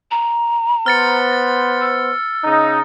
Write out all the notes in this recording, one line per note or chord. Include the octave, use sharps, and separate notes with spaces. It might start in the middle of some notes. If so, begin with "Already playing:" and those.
A#5
B3 C5 F6 A6 C#7
A6
E6
C#3 D#4